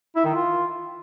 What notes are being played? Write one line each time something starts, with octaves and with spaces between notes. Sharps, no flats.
E4
D#3
F4